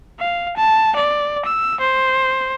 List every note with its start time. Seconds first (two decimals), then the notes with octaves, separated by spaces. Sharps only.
0.19 F5
0.56 A5
0.95 D5
1.45 E6
1.80 C5